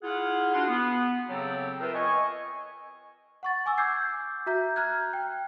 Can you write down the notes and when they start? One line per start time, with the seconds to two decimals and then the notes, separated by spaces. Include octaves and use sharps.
0.03 E4 F4 G#4 F5 F#5
0.53 D4 F4 F#4 F#5 C6
0.68 B3
1.29 C#3 F#3 C4 G4 A4
1.81 F4 A#4 B4 E5 G5
1.94 D#5 G#5 C#6
3.43 F#5 C#6 A6
3.66 G#5 D6 E6
3.78 D6 E6 G6 G#6 C7
4.46 F#4 E5 A#5 G6
4.76 A#5 F6 F#6 G#6
5.13 G5